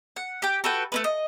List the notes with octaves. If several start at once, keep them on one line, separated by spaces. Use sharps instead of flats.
F#5
G4 G5
F#4 A4 B4 G5
A3 C#4 B4
D#5